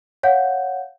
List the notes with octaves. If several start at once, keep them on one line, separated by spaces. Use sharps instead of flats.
C#5 F5 F#5 G6